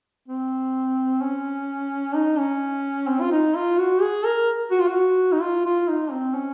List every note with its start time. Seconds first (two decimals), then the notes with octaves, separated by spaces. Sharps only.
0.28 C4
1.22 C#4
2.15 D#4
2.38 C#4
3.08 C4
3.21 F4
3.32 D#4
3.55 F4
3.79 F#4
4.02 G#4
4.25 A#4
4.71 F#4
4.80 F4
4.87 F#4
5.32 D#4
5.41 F4
5.66 F4
5.88 D#4
6.11 C4
6.35 C#4